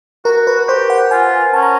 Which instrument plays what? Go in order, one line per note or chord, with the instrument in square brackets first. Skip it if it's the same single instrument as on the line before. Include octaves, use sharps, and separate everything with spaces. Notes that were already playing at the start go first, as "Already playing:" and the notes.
[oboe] F#4 [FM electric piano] A#4
[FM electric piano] B4
[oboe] F#4
[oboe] G4 [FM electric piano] C5
[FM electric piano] F#5
[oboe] F4 [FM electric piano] G#5
[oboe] C#4 [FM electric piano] A5
[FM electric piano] A#5